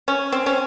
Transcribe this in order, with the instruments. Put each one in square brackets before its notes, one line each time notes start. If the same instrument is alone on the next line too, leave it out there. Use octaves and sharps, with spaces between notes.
[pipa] C#4
C4
C#4